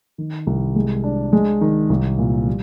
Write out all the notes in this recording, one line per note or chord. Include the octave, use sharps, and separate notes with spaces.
D#3
C2
G#3
D4
G#3
D#3
C2
A#2
G3